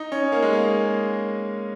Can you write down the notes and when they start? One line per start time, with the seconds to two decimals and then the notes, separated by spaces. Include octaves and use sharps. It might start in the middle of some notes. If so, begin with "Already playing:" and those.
Already playing: D#4
0.12 C#4
0.32 A#3
0.42 G#3
0.53 A#3